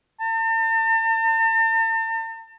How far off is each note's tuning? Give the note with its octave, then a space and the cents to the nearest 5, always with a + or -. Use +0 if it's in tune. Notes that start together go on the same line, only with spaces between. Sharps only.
A5 +45